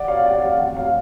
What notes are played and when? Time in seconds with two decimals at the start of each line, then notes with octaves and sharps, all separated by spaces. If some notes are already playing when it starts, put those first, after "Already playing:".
Already playing: D5 F#5
0.08 C#5 F5
0.25 D5 F#5
0.42 C#5 F5
0.59 D5 F#5
0.76 C#5 F5